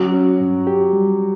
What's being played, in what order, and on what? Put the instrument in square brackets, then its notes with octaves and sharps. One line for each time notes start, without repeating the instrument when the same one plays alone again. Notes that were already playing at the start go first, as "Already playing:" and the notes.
Already playing: [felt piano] F#3 F#4 [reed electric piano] C#4
[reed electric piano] C#4
G2
G4
G3